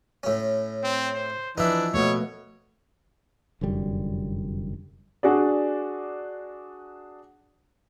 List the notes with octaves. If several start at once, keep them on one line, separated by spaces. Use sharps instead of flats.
A2 C#4
C4
C5
E3 F3 D4 D#4 B4 E5
B2 A3 A#3 B4 C#5
F1 F#2 D3 G3
D4 F#4 G#4 D5